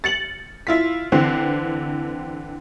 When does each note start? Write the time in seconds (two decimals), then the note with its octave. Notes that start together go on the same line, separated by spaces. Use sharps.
0.04 A6 C#7 F#7
0.67 E4 F4 B6
1.12 D3 E3 C4